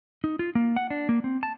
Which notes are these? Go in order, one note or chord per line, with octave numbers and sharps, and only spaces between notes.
D#4
F4
A#3
F#5
D4
A#3
C4
A5